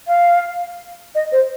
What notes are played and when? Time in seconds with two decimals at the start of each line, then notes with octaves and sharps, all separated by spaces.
0.07 F5
1.15 D#5
1.32 C5